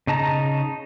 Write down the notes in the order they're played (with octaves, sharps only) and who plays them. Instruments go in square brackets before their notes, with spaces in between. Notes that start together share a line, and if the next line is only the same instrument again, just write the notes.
[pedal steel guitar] C#3 D#4 A5 A#5